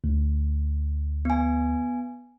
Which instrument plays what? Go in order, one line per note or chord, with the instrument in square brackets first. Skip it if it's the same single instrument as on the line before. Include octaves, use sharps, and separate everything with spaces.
[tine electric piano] D2
[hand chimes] B3 G#5